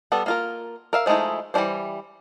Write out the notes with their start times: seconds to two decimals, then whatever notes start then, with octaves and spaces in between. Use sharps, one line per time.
0.12 G3 B3 A4
0.26 A#3 F4 A#4
0.93 A#4 E5 F5
1.06 F3 G#3 A3 D#4 E4
1.54 E3 G3 G#3 D4 C5